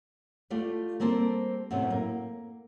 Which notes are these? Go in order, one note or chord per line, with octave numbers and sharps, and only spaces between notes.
A3 F4 G4 D5
G3 A#3 C4 C5 A5
F#2 A2 C3 B3 C4
A#3